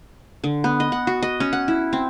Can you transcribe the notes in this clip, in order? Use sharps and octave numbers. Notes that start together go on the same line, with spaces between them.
D3
B3
D#5
F#5
F#4
D#5
C#4
F#5
E4
C4